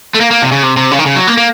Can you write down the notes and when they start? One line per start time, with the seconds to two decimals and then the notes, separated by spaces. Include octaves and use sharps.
0.15 A3
0.21 A#3
0.31 A#3
0.42 C3
0.52 C#3
0.63 C3
0.77 C3
0.91 C#3
0.99 D#3
1.06 C#3
1.16 F#3
1.27 A#3
1.37 A#3